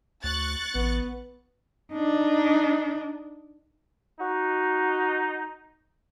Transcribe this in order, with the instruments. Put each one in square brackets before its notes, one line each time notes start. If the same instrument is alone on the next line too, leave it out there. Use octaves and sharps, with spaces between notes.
[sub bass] D2 [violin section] C#6 F#6 A6
[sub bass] A1 [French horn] B3
[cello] D4 D#4
[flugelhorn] D#4 [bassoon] F#4